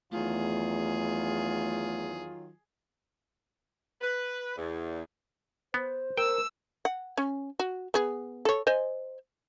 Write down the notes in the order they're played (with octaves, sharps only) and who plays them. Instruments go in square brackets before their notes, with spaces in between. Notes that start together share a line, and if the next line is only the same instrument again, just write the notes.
[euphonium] E2 [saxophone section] D#3 F#3 F4 [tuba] A3 [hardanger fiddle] G#4
[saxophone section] B4
E2
[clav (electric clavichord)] B3 [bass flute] C5
[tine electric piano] A#4 [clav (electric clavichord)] G5 [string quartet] E6
[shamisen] F#5
C#4
F#4
B3 G#4
A4 C#5
C5 D#5 G#5